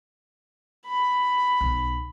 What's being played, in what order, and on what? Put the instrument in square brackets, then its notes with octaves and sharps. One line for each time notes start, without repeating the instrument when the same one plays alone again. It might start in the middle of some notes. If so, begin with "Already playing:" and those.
[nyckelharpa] B5
[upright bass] B1